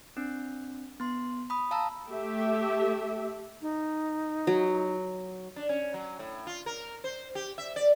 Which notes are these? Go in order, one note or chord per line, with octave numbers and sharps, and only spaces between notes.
C4 D4
B3 C6
B5 D#6
F5 A5 A#5 E6
A3 G4 E5
D#4
F#3
D4
C#4
F#3
A2
F4
A#4
C5
G4
E5
D5